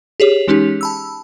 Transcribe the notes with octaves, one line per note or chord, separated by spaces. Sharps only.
G4 G#4 C#5
E3 G#3 C#4 D#4 G4
A5 B5 E6